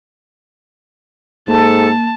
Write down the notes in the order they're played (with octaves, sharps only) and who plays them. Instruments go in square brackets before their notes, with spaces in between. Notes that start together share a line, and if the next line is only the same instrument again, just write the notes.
[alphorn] G#2 [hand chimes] A#3 [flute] A4 [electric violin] A5